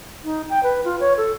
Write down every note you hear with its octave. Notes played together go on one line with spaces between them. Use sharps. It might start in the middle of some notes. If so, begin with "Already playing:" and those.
D#4
G5
B4
F4
C#5
A4